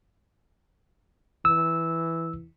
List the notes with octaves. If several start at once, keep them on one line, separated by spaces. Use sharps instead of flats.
E3 E6